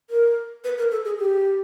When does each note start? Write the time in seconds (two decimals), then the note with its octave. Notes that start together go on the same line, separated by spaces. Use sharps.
0.10 A#4
0.64 B4
0.78 A#4
0.91 A4
1.05 G#4
1.19 G4